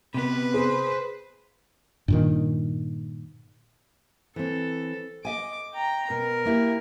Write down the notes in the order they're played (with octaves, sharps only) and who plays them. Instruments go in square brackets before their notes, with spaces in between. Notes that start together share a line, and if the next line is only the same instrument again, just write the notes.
[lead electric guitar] C3 B3 [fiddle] B4
[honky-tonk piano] G#4 [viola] C5
[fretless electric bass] G2 A#2 D#3
[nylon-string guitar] E3 C4 [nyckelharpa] A4
[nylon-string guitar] D#5 E5 G#5 [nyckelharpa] D6
[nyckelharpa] G5 A#5
[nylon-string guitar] B2 [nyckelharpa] A#4
[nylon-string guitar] A#3 E4 G4